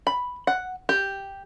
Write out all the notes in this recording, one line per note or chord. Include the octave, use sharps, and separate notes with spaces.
B5
F#5
G4